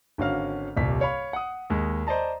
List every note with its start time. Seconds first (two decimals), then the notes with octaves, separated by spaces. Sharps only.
0.18 G#1 D3 C#4 F#4 F5 F6
0.77 D#1 C2 B6
1.01 C#5 F5 B5
1.33 F#5 D#6
1.70 D#2 G#3
2.07 C5 D5 D#5 A5 A#5